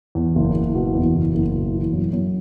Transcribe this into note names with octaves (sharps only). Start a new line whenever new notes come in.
E2
F#1
F#1
B2
E2
F#1
F#1
B2
E3
F#2
F#2